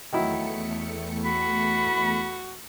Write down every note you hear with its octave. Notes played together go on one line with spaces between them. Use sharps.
E2 D#3 F#3 A3 E4 C#7
F#4 B5